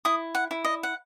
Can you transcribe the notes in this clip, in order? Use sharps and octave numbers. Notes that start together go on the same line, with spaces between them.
E4 D#6
F#5
E4
D#5
F#5